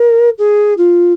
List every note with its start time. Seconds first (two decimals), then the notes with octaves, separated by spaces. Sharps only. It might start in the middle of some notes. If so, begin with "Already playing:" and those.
Already playing: A#4
0.38 G#4
0.77 F4